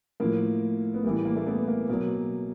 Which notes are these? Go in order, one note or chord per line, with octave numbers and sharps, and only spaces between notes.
A2 F3 A#3
B3
A2 E3 G3 A#3
A#3
A3
A3 B3
A#3
B2 F#3 A#3